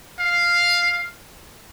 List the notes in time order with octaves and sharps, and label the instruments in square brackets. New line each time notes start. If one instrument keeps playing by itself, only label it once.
[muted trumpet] F5